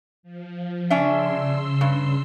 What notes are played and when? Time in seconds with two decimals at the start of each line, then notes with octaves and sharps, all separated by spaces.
0.23 F3
0.90 C#3 C#4 D4 E5 C6 E6
1.81 G2